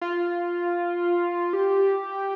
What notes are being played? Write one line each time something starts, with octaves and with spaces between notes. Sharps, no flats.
F4
G4